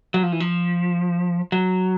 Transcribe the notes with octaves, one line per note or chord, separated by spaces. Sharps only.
F#3
F3
E3
F3
F#3